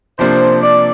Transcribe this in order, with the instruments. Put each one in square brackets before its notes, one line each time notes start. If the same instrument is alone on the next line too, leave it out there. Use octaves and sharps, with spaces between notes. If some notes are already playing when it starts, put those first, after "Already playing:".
[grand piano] C3 F3 A#3 D4 [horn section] C5
[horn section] D5